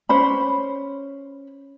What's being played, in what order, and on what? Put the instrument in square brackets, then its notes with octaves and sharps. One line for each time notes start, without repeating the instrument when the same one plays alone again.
[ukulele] C#4 C5 B5